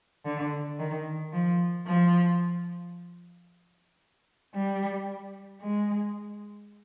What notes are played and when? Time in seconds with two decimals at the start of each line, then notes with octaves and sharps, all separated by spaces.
0.25 D3
0.79 D#3
1.33 F3
1.86 F3
4.54 G3
5.61 G#3